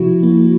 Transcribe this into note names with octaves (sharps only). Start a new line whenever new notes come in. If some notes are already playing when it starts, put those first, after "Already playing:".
Already playing: C3 F3 E4 F#4
A#3